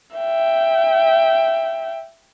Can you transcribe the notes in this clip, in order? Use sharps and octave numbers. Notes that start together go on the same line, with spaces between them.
E5 G5